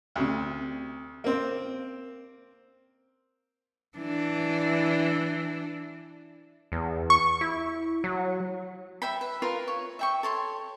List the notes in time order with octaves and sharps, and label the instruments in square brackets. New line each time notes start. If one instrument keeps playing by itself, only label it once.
[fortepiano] D2 C3
A#3 C4
[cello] E3 D4
[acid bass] E2
[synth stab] C#6
[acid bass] E4
F#3
[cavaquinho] E5 G5 B5
B4
F4 A#4 B4 F5
C#5
E5 G5 C#6
A4 C#5 C6